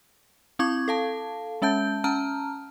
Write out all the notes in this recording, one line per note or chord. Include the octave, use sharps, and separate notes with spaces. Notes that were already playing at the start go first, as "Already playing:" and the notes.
C4 E4 C#6 D6 G#6
A4 F5 A5
G#3 C#4 E5 A5 G6
C#4 A5 A#5 F6